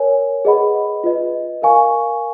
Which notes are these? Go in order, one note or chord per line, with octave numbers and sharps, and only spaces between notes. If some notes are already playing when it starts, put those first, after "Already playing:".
Already playing: A#4 C#5 G#5
G#4 B4 D#5 F#5 B5
F4 B4 D#5
A#4 F5 G#5 C#6